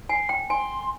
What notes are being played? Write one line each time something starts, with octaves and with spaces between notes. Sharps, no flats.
G#5 C7
G5
G#5 C6